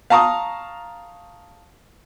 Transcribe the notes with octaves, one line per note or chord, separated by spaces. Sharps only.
F5 A5 A#5 C#6 D#6